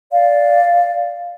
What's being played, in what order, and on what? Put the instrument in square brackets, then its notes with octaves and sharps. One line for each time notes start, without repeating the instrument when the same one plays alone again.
[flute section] D5 F5